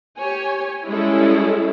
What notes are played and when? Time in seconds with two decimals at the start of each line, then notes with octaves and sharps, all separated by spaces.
0.19 G4 C#5 G#5
0.88 G3 G#3 C#4 E4 G#4 A4